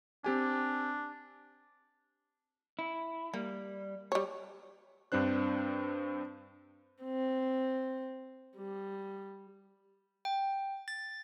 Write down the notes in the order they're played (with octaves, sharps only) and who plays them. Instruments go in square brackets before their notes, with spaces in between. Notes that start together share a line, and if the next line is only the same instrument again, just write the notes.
[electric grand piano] C4 G4 G#5 [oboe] D4
[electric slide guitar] E4
[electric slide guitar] G3 [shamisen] A#3
[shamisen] G3 C#5
[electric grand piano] G2 C4 D4 C5 F#6
[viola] C4
G3
[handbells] G5
A6